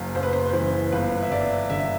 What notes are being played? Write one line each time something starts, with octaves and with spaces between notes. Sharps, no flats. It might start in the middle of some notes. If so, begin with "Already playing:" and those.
Already playing: F#1 F#2
F#1 C5
B4
C5
E3 C5
G1 B4
E5
G1 D5
D3 E5